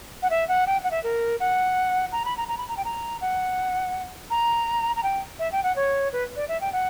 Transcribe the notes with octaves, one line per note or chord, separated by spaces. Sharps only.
F#5
E5
F#5
G5
F#5
E5
A#4
F#5
A#5
B5
A#5
A#5
B5
A#5
G5
A#5
F#5
A#5
A#5
G5
E5
G5
F#5
C#5
B4
D5
E5
G5
F#5